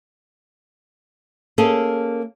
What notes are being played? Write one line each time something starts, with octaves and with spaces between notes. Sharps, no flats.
A#3 C#4 G#4 A4